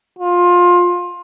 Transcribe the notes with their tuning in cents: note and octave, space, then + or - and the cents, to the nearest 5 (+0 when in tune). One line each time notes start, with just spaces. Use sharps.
F4 +20